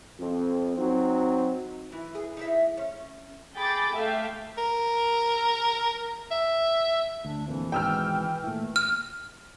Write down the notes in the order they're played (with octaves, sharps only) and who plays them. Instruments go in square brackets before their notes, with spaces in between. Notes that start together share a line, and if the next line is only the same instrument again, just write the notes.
[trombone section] F2
F#3 C4 D#4
[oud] E3
G#4
D#4 E4 E5
C#4
[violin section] G#4 G5 B5 D6 A6
A3 E5 F5 G5
[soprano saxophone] A#4
E5
[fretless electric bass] D2 [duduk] D4
[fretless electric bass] F2 A#2 F3 [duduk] E3
[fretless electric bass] G#1 G#2 B2 [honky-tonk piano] G5 E6 F6
[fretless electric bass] A#2 E3 [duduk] A3
[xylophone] F6